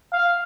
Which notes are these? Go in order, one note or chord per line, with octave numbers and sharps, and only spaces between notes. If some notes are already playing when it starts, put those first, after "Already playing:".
F5